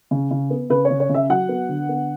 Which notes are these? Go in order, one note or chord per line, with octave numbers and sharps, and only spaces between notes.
C#3
C#3
B3
C#3 B4
C#5
C#3
C#5
C#3
E5
F#3 F#5
B3
D3
B3